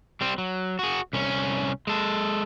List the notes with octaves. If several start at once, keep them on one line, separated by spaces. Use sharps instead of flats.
G3 C4
F#3
F#4 G#4
C2 C#4
G#3 A4